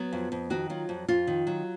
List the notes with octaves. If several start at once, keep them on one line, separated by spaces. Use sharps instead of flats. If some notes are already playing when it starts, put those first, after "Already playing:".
Already playing: F#3 B3
F2
F2
D#3 F#4
F#3 F4
F2
F2 F4
D#3
F#3